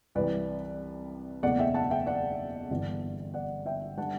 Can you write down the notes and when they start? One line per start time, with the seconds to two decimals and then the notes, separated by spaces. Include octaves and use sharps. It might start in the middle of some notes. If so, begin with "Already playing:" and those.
0.15 C2 C3 E3 G3 B4 D5
1.43 F#1 E2 B2 A3 D5 F#5
1.59 E5 G5
1.74 F#5 A5
1.91 E5 G5
2.06 D5 F#5
2.70 G1 G2 E3
3.34 D5 F#5
3.66 E5 G5
3.97 D3 G3 F#5 A5